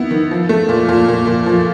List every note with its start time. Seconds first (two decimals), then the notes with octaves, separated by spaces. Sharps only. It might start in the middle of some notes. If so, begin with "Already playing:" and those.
Already playing: D#3 B3 E4
0.11 D#3
0.31 F3
0.49 A3
0.69 A#2
0.88 A#2
1.08 A#2
1.27 A#2
1.46 F3